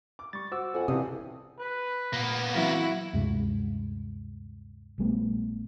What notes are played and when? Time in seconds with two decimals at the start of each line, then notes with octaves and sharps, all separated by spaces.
0.19 D6
0.33 G3 C#6 A6
0.52 F#4 C5 D6 E6
0.74 F2 F#5 G#5
0.88 G2 C3 E3 C4 C#4 D#6
1.60 B4 F#6
2.13 A#2 A#3 B3 D#7
2.55 E3 F#3 C4 E4 F#4
3.13 D2 G2 C3 G#3
4.98 A#1 G3 A3 B3